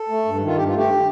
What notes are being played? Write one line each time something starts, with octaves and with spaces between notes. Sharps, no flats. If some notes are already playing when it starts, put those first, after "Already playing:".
Already playing: A4
A3
G2
D#3
F4
G2 G4
F4
A3
G4